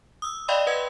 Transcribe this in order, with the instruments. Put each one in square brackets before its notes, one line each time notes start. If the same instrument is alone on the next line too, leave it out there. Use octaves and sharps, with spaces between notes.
[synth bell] D#6 E6
D5 D#5 F5 G5 B5 C6
B4 F#5 D#6 G#6